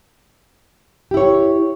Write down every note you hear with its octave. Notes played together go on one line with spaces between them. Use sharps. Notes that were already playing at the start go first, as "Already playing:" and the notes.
E4 G4 C#5